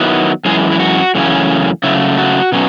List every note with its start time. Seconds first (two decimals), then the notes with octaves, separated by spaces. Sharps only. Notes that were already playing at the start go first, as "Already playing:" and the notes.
Already playing: D#3 F#3 B3 E4
0.45 F#2 E3 G#3 G#4
0.71 E4
0.79 F#4
1.15 F#2 C#3 E3 A3 C#4
1.83 C#3 F#3 A3 E4
2.18 F#4
2.52 B2 F#3 C#4